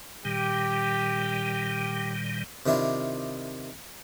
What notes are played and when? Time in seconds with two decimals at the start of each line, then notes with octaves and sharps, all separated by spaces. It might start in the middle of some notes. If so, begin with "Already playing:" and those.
0.25 A#2 D#3 G3 G4
2.66 C3 D#3 D4 E4 F4